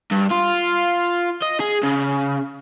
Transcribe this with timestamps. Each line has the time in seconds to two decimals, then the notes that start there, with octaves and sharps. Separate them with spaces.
0.11 G2
0.30 F4
1.42 D#5
1.60 G#4
1.83 C#3